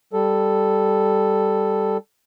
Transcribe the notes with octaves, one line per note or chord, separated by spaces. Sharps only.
G3 A4